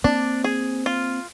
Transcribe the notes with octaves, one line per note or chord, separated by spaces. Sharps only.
A#3 C4 D4
G#4
F4